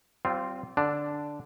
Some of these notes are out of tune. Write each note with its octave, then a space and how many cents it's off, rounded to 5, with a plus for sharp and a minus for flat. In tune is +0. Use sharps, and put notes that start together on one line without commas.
G3 -40 C4 -10 F4 +0
D3 +0 D4 +0